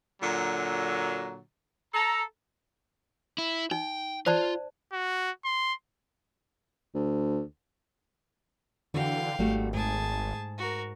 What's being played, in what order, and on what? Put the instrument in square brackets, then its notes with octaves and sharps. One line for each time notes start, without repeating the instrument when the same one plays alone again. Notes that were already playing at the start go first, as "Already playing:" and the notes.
[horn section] A#2 D3 F#3
A4 A#5
[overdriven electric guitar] E4
[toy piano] D#4 [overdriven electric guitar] G5
[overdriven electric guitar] F4 [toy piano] C5 D5 A5
[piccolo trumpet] F#4
C6
[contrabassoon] D2
[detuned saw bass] D3 [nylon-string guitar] E3 F#4 [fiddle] F5 G5
[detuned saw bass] G#1 [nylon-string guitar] G3 A3 F#4
[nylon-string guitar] G#2 [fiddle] G#4 A5
[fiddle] F#4 A#4